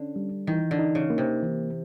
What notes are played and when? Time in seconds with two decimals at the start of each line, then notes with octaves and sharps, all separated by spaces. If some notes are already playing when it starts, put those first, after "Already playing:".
Already playing: D3 C#4
0.16 G3
0.47 D#3 E3
0.71 D3
0.79 D#4
0.95 C#3
1.10 A#3
1.18 C3
1.42 E3